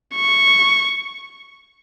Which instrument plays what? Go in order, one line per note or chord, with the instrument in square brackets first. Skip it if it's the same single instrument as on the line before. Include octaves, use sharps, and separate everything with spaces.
[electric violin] C#6